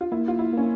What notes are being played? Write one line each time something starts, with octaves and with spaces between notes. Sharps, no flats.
F4
A#3 E4
F4
E4
A#3 C#4